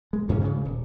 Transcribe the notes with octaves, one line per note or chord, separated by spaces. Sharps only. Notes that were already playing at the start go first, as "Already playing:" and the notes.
G#3
D2 G2 C#3 C#4
D2 G#2 C#3
D#1